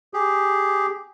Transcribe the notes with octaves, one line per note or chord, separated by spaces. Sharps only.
G4 G#4